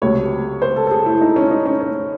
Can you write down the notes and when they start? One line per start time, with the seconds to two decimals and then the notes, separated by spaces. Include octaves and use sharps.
0.02 C#2 C3 F#3 A3 C#5
0.62 C5
0.76 A4
0.87 A4
0.91 G#4
1.06 E4
1.21 D#4
1.36 C#4
1.51 D#4
1.65 C#4
1.81 C#4